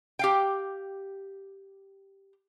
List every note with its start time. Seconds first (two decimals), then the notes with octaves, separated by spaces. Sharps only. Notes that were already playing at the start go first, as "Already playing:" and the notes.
0.19 G4 F5 G5